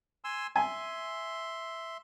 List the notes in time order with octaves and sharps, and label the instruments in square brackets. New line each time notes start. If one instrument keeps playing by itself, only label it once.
[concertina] G#5 C6 E6
[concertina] E5 C6 [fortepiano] G#5